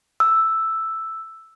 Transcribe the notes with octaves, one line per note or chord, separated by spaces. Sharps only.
E6